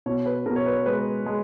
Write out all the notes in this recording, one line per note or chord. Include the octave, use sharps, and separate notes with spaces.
B2 C#5
B4
B2 A#4
C#5
B4
G#3 B4
G#3